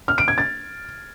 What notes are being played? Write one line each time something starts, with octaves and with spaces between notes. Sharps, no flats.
F6
D7
G#6
A6